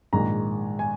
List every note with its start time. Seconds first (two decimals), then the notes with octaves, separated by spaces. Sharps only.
0.13 A#1 G#2 D#3 A#5
0.79 G#5